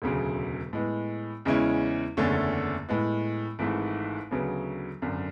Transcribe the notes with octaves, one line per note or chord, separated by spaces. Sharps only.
E1 D2 C#3 F#3
A2 G#3 B3
E2 C#3 G#3 C#4 E4
F#1 E2 D3 A3 C#4
A2 G#3 B3
G#1 G#2 E3 A3
D2 C#3 F#3 B3
G#1 F#2 D3